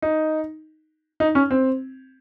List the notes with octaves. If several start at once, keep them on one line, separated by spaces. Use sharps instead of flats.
D#4
D#4
C#4
C4